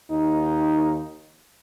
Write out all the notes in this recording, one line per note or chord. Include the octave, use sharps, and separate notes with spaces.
D#2 D#4